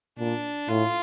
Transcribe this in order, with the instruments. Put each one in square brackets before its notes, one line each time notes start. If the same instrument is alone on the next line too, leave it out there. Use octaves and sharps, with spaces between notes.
[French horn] A#2 [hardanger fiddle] D4
[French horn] A2 [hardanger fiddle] F4